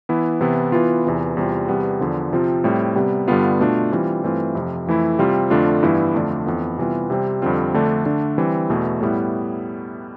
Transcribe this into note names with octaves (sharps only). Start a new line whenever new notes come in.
E3 B3 E4
C3 E3 B3 E4
E3 B3 F4
E2 C3 E3
E2 C3 G3 C4 F4
E2 C3 G3 B3
E2 D3 F3
C3 F3 C4 F4
A2 G3 C4
C3 G3 B3
G2 D3 G3 B3 F4
B2 A3 D4 F4
E3 G3 C4 F4
G2 E3 A3 C4 F4
F2 C3 F3
F2 E3 A3 E4
C3 G3 C4 F4
F2 D3 A3 D4 F4
G2 E3 B3 E4
F2 D3 A3 D4 F4
F2 E3 B3
C3 E3 G3 B3 F4
C3 G3 C4
F2 D3 G3 C4 F4
F2 D3 A3 D4
D3 A3 D4
E3 G3 C4
E2 B2 A3 E4
A2 G3 B3 E4